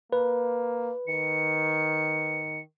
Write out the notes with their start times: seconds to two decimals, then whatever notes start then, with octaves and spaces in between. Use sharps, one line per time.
0.13 A#3 B4
1.08 D#3 C#7